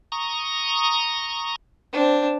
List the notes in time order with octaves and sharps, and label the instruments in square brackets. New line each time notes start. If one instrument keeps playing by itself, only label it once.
[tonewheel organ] A#5 C#6 D#6
[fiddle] C4 D4